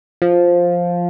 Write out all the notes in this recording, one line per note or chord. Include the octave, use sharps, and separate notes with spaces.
F3